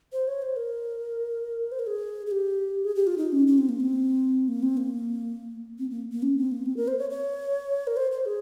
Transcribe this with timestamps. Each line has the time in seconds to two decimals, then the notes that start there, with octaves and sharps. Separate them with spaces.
0.13 C5
0.28 C#5
0.42 C5
0.56 A#4
1.72 C5
1.79 A#4
1.87 G#4
2.26 G#4
2.31 G4
2.85 G#4
2.95 G4
3.07 F4
3.18 D#4
3.32 C#4
3.47 C#4
3.58 C4
3.69 A#3
3.80 C4
4.48 A#3
4.63 C4
4.77 A#3
5.79 C4
5.90 A#3
6.12 A#3
6.23 C#4
6.37 C4
6.52 A#3
6.66 C4
6.77 A#4
6.88 C5
6.99 C#5
7.10 C#5
7.87 A#4
7.97 C5
8.11 C5
8.26 G#4